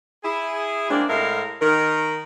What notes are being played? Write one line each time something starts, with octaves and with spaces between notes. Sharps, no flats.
E4 G#4
G#3 A#3 C4 D4
A2 G#3 A#4 E5 F5
D#3 A#4